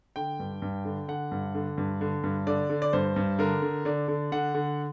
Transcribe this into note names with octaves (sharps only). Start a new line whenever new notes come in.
D3 G5
G2
G2
D3
D3 F#5
G2
D3
G2
D3
G2
D3 D5
D3
D5
G2 C5
G2
D3 A#4
D3
D3 D5
D3
D3 F#5
D3